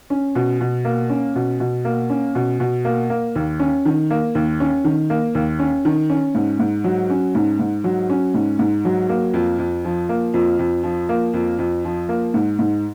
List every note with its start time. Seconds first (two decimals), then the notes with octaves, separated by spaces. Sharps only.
0.10 C#4
0.35 B2
0.61 B2
0.85 A#3
1.10 C#4
1.35 B2
1.60 B2
1.85 A#3
2.10 C#4
2.35 B2
2.60 B2
2.85 A#3
3.10 A#3
3.35 D#2
3.60 C#4
3.85 D#3
4.10 A#3
4.35 D#2
4.60 C#4
4.84 D#3
5.10 A#3
5.35 D#2
5.59 C#4
5.85 D#3
6.10 C#4
6.35 G#2
6.60 G#2
6.84 F#3
7.10 C#4
7.35 G#2
7.59 G#2
7.84 F#3
8.10 C#4
8.34 G#2
8.59 G#2
8.85 F#3
9.09 A#3
9.34 F2
9.59 F2
9.85 F3
10.09 A#3
10.34 F2
10.59 F2
10.83 F3
11.09 A#3
11.34 F2
11.59 F2
11.85 F3
12.09 A#3
12.34 G#2
12.59 G#2